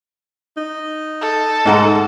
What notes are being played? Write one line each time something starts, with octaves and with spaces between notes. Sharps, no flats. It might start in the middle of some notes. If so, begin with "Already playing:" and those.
D#4
A4
G#2 G#3 A3 D#5 F#5 A#5